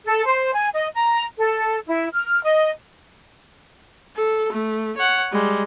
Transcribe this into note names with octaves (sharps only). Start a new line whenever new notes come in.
A4
C5
G#5
D#5
A#5
A4
E4
F6
D#5
A4
A3
C#5 F#5
G3 G#3